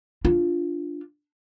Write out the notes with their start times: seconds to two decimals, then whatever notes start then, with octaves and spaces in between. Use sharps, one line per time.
0.25 D4 F4